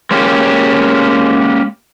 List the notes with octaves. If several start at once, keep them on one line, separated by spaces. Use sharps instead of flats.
G#3 A#3 C#4 G4